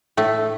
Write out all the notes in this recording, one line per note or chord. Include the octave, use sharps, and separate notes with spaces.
A2 A3